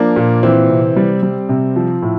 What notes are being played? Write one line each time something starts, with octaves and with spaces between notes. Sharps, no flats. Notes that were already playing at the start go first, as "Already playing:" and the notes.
Already playing: F3 A#3 D4
A#2
E3 C4
C3
G3
G3
C3
F3
A2